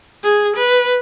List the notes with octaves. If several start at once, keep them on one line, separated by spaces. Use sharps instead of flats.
G#4
B4